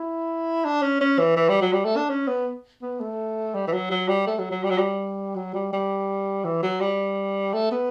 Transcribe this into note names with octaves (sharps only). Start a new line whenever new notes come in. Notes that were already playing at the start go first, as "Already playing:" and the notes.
Already playing: E4
D4
C#4
C#4
E3
E3
G3
F#3
G3
A3
D4
C#4
B3
B3
A3
G3
E3
F#3
F#3
G3
A3
F#3
F#3
G3
F#3
G3
F#3
G3
G3
E3
F#3
G3
A3
B3